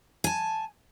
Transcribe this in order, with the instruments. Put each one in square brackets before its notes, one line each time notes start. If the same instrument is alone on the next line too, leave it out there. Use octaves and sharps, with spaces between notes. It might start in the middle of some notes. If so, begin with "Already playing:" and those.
[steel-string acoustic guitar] G#5 A5